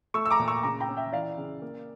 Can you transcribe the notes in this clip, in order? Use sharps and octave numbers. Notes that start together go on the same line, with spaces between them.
A3 C#6 E6
E6
A#5 D6
A#2
C#6 E6
C#3 A#5 D6
G5 A#5
C#4
E5 G5
E3 D5 F5
C#3
A#3